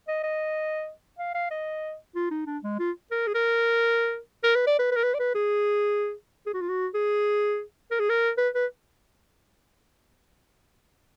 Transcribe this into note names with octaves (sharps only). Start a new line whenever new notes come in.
D#5
D#5
F5
F5
D#5
F4
D#4
D4
G#3
F4
A#4
G#4
A#4
A#4
B4
D5
B4
B4
A#4
B4
D5
B4
G#4
G#4
F#4
F4
F#4
G#4
A#4
G#4
A#4
B4
B4